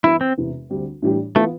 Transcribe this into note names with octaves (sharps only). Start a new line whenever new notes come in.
G2 E3 B3 E4
C4
E1 E2 C3 E3
D2 D3 G3 C4
A2 E3 G3 D4 G4
E3 A3 B3 F4